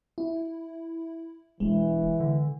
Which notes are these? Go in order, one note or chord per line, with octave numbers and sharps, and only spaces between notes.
E4
E1 E3 G#3
D3